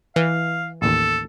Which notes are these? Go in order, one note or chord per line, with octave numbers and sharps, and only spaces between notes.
E3 F5
A1 D#2 A4